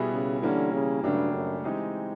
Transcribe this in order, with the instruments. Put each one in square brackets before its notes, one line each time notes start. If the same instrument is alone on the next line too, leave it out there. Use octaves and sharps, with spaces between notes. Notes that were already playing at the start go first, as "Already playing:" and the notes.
Already playing: [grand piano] B2 G3 B3 E4 G#4
[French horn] C#3
[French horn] D3 [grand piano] E3 G3 A#3 C#4
[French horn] C#3
[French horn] G2 [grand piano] C#3 F#3 A3 D4 G4
[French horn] F#2
[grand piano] E3 G#3 C4 D#4 G4